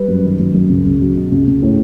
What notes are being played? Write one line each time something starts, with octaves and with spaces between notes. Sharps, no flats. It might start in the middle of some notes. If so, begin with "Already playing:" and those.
Already playing: G3 B4
F#2
D#3
F#2
F#2
C#2
C#2
F#3
B2
C#2
C#2
A2